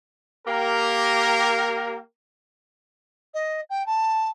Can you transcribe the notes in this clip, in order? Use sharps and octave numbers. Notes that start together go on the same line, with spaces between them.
A#3 G4 A#4
D#5
G5
A5